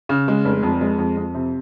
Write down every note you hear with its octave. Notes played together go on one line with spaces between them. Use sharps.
C#3
G#3
F1
F2
G#3
F2
F2
C3